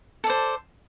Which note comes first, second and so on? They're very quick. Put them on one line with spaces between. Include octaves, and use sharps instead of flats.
A4 D5 C5